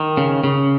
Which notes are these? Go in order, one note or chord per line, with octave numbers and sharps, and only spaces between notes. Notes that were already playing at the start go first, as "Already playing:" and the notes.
Already playing: D#3
C#3
C#3